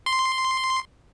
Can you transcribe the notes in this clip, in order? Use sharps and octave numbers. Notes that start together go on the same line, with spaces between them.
C6